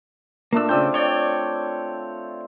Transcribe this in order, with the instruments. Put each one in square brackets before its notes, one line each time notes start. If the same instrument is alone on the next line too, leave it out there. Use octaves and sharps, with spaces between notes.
[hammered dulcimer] A#2 A3 D4 [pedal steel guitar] A#3 E6
[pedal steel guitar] C#3 E6 G6 [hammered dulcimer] C4 F4 D5
[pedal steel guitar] C#5 G5 [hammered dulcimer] D5